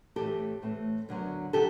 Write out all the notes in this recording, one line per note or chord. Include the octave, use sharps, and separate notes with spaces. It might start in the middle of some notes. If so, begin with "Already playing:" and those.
A2 E3 A3 C4 G4 A4
A2 E3 A3 C4
F#2 D3 F#3 B3
D3 F#3 G4 A4